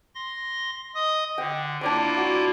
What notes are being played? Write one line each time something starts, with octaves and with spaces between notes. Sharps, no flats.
C6 A#6
D#5 D#6
D3 G5
A#3 D4 E4 F4 D5 D6
F#4